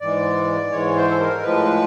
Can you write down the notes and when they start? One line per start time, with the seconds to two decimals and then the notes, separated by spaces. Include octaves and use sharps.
0.01 G#2 E3 G#3 D5
0.72 G#2 E3 G#3 C#5
0.96 C5
1.10 A4
1.19 A#4
1.43 A2 F3 G#3 B4